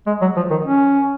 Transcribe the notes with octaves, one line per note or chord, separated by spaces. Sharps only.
G#3
F#3
F3
D#3
C#4